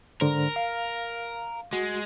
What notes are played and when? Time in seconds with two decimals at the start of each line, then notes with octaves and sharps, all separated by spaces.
0.21 G#2 D3 A#4 C5
0.56 F5
1.73 G#3 F#4